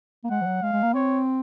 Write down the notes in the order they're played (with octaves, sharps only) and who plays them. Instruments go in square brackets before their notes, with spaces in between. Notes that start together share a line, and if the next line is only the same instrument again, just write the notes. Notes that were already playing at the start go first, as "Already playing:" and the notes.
[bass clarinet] A#3
[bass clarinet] G#3 [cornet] F#5
[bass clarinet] F3
F#3
[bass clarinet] G#3 [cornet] F5
[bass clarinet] G#3
A#3
[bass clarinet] C4 [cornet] C#5